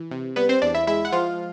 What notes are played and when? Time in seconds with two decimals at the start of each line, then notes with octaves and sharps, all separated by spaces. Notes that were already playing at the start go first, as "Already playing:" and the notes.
Already playing: E3
0.11 C3
0.36 G3 B3 B4
0.49 C4 C5
0.62 E2 D4 D5
0.74 E4 E5
0.87 G#3 E4 E5
1.05 F#5
1.12 F3 F4 F5